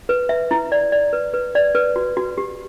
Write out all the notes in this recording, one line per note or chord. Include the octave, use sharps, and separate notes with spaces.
B4
E5
E4
D5
D5
B4
B4
D5
B4
F#4
F#4
G4